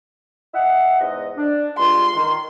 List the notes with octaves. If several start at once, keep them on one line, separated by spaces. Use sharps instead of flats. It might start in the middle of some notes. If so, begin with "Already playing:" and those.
D#5 E5 F#5
E2 G#2 D#5
D4
G2 G#3 F4 C6
D#3